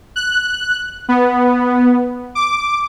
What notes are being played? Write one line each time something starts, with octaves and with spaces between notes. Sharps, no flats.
F#6
B3
D6